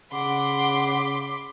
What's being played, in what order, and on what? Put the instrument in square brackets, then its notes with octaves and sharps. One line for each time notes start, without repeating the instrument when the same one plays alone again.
[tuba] C#3 [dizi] F#5 [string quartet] B5 C6 [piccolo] D6